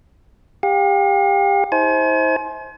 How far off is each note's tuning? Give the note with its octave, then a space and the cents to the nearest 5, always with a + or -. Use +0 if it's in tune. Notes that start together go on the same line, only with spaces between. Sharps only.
G4 +25 F5 +45
E4 -45 C5 +10 G#5 +40